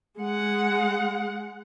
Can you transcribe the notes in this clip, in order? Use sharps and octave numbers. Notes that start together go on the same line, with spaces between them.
G#3 F#5